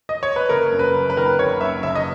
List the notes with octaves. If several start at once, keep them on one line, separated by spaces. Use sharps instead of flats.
D#5
C#5
B4
F#1 A#4
F#2
B4
F#1
B4
D#3 A#4
B4
F#1 C#5
F#2 E5
F#1 E5
D#5